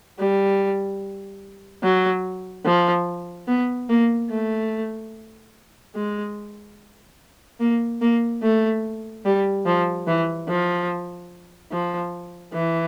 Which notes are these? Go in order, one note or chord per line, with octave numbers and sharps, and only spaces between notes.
G3
F#3
F3
B3
A#3
A3
G#3
A#3
A#3
A3
G3
F3
E3
F3
F3
E3